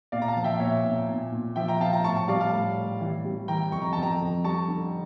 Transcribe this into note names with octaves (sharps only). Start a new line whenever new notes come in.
A#2 D5 F5
A#5
F5 A5
F3
E5 G5
A#2 C#5 E5
A#2
A#2
A#2
F3 E5 G5
G5 A#5
F3 F5 A5
G5 A#5
A2 A5 C#6
A5 C#6
G3 D5 F5
F5 A5
A2
A2
E3
G3
E3 G5 A#5
F2 C#6
A#5
F2 A5
G5 A#5
F2
G3 A5 C#6
D3